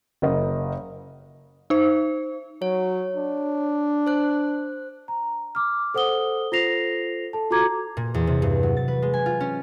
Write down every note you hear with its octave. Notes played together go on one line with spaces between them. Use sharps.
F#1 A#4 D#5
D#4 C5
F#3 C#5
D4
C5 F#6
A#5
D6 F6
A4 C5 F#5 D#6 G7
F4 A4 C5 A#6 C7 F7
A4 A5
F4 F#4 A4 A#5 D6 G#6
A#2
E2
C3
G2
F#3
A6
B4
G#3
G#5
F4
C#4